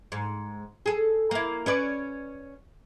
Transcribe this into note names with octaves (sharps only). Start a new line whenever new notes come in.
G#2
G#4 A4
A#3 E4
C#4 B4 D5